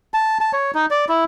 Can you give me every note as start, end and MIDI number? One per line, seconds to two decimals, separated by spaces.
0.14 0.38 81
0.41 0.52 81
0.53 0.71 73
0.75 0.86 63
0.91 1.05 74
1.09 1.24 64